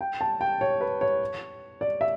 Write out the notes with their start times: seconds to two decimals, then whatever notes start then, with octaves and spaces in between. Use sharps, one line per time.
0.01 G5
0.21 A5
0.41 G5
0.61 C#5
0.81 B4
1.01 C#5
1.81 D5
2.01 E5